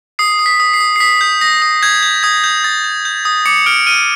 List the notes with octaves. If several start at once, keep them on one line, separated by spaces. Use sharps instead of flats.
D#6 C7
D#6
B6
D#6
C7
D#6
C7
D#6 B6
G6
D#6 A#6
D#6
G6 G#6
G6
D#6 G#6
G6
D#6 A6
G6
G6
D#6
D6 C#7
F6 D7
F6 D#7